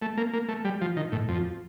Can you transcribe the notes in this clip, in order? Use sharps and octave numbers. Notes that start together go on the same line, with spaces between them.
A3
A#3
A#3
A3
G3
F3
D#3
A2
F2